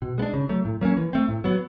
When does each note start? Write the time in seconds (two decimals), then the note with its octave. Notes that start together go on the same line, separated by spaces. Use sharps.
0.02 B2
0.18 G#3 B3
0.22 D4
0.34 C#3
0.49 F#3 A3
0.65 A2
0.81 F#3 A#3 C#4
0.97 E3
1.13 A3 C4
1.29 A2
1.44 F#3 B3